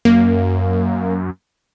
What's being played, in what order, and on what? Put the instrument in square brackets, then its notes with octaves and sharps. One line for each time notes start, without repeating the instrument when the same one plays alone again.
[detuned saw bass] F#2 [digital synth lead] A#3